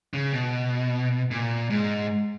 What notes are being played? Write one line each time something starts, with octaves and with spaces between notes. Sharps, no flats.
C#3
B2
A#2
G#2